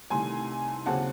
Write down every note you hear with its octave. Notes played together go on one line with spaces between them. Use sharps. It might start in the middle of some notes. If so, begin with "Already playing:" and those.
C2 C3 D#3 A3 G#5 C6
D#2 C#3 F#3 C4 F#5 A5